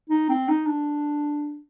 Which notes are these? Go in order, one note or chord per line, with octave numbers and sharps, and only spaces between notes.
D#4
C4
D#4
D4